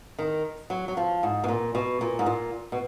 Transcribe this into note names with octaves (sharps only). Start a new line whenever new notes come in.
D#3
F#3
F#3
F3
G#2
B2
A#2
B2
A#2
G#2
A#2
B2